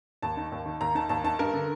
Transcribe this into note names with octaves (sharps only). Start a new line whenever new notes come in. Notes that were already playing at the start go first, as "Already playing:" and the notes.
D#2 A5
D#3
D#2
D#3
D#2 A#5
D#3 A5
D#2 A5
D#3 A5
G2 A#4
D3